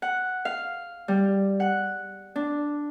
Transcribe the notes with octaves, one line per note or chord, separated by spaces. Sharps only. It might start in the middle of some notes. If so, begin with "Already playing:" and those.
F#5
F5
G3
F#5
D4